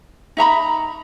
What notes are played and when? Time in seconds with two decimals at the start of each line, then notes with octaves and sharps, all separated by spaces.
0.37 D#4 E5 A#5 B5